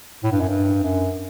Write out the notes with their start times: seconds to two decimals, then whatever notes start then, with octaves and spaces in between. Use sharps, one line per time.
0.24 A2
0.32 G2
0.40 F#2
0.48 G2
0.83 F#2